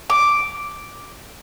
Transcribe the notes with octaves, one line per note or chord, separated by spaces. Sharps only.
D6